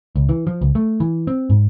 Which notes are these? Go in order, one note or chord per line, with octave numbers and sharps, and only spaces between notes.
C#2
E3
F3
C#2
A3
E3
C4
G#2